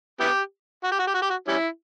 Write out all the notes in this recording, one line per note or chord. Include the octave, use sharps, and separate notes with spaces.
B3 E4 G4
F#4
G4
F#4
G4
F#4
G4
F#4
G3 C#4 E4